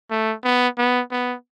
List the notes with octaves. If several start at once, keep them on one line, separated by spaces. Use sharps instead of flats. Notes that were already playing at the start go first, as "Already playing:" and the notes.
A3
B3
B3
B3